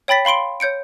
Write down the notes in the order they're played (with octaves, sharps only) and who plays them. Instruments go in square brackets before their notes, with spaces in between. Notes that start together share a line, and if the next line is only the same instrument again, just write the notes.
[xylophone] C#5 G5 B5 A6 B6
F5 B5 C6 D7 G7
C#5 G6 C#7 D7